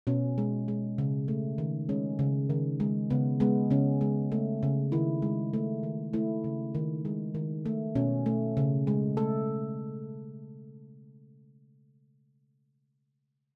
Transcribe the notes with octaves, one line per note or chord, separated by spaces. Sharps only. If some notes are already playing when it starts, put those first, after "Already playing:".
B2 C#4
G#3
G#3
C#3
A3
D#3
G#3 C#4
C#3
D#3
G#3
C#3 B3
G#3 B3
C#3 C#4
G#3
A3
C#3
D#3 E4
G#3
A3
D#3
A3 E4
C#3
D#3
G#3
D#3
A3
B2 C#4
A3
C#3
G#3
A3 A4